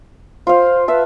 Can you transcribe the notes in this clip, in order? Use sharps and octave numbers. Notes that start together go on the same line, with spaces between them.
F4 C5 F5
B4 E5 A5